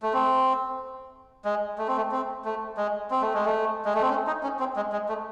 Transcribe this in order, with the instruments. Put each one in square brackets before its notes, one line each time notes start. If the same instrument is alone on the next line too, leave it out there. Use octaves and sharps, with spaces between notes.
[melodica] A3
C4
G#3
A3
C4
A3
C4
A3
G#3
C4
A3
G#3
A3
G#3
A3
C4
C#4
D#4
C#4
C4
G#3
G#3
A3